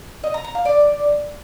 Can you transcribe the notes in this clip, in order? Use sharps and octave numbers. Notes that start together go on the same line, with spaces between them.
D#5
A#5
A#5
F5
D5